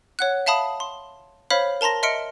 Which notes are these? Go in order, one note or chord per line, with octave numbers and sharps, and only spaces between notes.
C#5 F#5 F#6
E5 F5 A5 B5 D#6
C6
C5 C#5 F5 B5 F6 B6
A#4 A5 A#5 C6 A#6
D#5 E5 C6 F6 C#7 D7